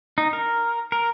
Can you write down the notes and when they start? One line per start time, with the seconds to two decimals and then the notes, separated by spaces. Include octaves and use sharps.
0.18 D#4
0.33 A#4
0.92 A#4